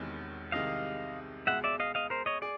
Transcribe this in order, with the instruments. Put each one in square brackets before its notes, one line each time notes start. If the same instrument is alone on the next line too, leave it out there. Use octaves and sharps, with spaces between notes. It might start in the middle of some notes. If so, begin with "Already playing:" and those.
Already playing: [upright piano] E1 E2 C3 D#3
[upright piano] C2 C3 D#3 G#3 [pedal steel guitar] D#5 F5
[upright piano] C#2 B2 G#3 [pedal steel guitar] E5 F#5
[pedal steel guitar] D5 E5
D#5 F5
D#5 F5
A#4 C5
C#5 D#5
[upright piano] G#4 [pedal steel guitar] D5